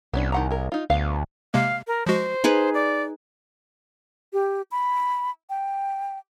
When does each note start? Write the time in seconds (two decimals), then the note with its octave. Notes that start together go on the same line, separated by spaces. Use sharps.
0.13 C2 B3 C#4 D4
0.32 D#3 F#5 A#5
0.50 G#4 A#4
0.72 D#4 F4
0.90 D2 B3 F5
1.54 C3 G#3 A#3 F5
1.87 A#4
2.06 F3 G#3 F#4 C5
2.44 D#4 G#4 B4
2.74 D5
4.33 G4
4.71 B5
5.50 G5